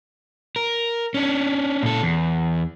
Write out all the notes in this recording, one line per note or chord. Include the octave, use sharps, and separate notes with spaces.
A#4
C#4 D4
A#2 A4
E2